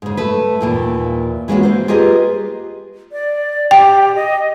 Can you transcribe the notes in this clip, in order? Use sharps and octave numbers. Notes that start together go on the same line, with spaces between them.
G#2 C#3
A3 B4
D#2 A#2 E3
E3 G#3 A#3 C#4 F4 F#4
C4 C5
F4 G4 G#4 A#4 B4 D#5
D5
G4 G5
D#5